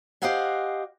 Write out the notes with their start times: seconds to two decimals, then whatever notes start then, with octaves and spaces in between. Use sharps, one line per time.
0.22 G4 C5 D#5 F5 F#5 G#5